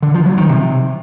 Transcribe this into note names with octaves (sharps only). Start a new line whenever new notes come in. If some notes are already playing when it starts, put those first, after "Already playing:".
D3
F3
F#3
D#3
C3